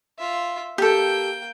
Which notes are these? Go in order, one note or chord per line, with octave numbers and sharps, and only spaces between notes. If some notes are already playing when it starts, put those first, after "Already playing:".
F4 E5
A#3 G4 A4 G5